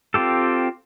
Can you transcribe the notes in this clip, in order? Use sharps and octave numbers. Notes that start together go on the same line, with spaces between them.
C4 F4 G4 A4